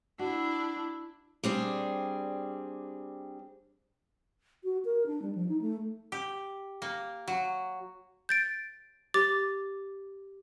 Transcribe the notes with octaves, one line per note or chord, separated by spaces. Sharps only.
D4 E4 F#4
G3 C4 D4 G#4
F#4
A#4
D4
G3
F3
D#4
A3
G4
A#3
F#3
G6 A6 D7
G4 D6 A6